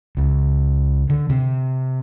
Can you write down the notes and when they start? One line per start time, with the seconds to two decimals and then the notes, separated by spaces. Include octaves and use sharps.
0.17 C#2
1.10 D3
1.30 C3